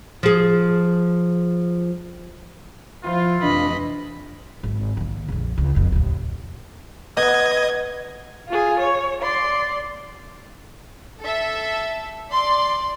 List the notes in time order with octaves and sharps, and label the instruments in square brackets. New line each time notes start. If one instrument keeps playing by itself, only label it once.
[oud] F3 G#4
[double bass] F3 [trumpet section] E4 F4
[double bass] F1 E3 [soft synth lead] D4 [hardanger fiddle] D#5 B5
[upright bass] G#1
D#3 A#3
A#1 F2
C#2
F1 F2
D#2 A2
[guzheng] B3 [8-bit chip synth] D#5 [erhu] G#6
[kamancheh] F4 G#4
C#5
D5 C6
[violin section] A4 E5
D5 C6